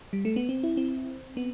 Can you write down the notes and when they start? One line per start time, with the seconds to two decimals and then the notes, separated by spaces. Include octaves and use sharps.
0.13 G3
0.25 A3
0.36 B3
0.49 C4
0.63 E4
0.77 C4
1.37 B3